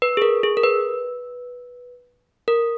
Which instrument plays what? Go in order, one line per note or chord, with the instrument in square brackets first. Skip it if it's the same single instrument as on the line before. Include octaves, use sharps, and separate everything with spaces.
[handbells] B4
G#4
A#4
G#4
A#4
B4
A#4